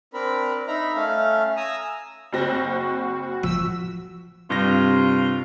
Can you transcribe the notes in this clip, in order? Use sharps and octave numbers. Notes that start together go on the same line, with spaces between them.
C4 D4 A#4 B5
D#4 E5 A#5 B5
A3 C#4 E5 F5
G#5 A#5 D#6 E6
F#1 C4 F#4 A#6
F3 E6 B6
G2 C3 F4 A#6